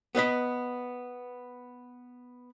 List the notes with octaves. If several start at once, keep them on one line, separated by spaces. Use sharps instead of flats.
B3 B4 D#5 B5